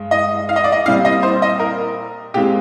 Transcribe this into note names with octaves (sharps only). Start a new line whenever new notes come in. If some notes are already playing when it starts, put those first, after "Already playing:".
Already playing: G2 G#3
D#5
F5
D#5
D5
D#5
A#2 G3 C4 F5
D#5
C5
D#5
A#4
A#2 G#3 C4 G4